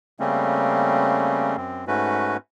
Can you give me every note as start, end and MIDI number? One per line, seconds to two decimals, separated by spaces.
0.20 1.56 49
0.20 1.56 55
0.20 1.56 57
0.20 1.56 58
0.20 1.56 60
0.20 1.56 61
1.56 1.85 42
1.56 1.85 60
1.87 2.37 44
1.87 2.37 57
1.87 2.37 61
1.87 2.37 66
1.87 2.37 71